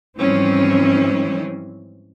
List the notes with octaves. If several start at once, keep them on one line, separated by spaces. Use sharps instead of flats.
G#2 E3 F3 G3 C4 C#4